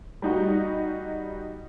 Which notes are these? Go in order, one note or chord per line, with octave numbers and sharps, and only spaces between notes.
G3 D#4 F#4